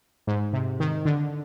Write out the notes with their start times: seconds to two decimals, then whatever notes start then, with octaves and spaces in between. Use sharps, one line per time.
0.27 G#2
0.53 C3
0.80 D#3
1.05 D3